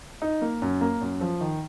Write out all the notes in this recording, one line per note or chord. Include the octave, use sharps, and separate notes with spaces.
D#4
A#3
F#2
A#3
F#2
F3
D#3